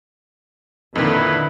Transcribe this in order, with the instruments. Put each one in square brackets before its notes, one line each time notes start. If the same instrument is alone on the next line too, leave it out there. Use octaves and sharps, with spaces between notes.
[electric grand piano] F2 A#2 D#3 [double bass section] D3 [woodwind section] D#4 E4 B4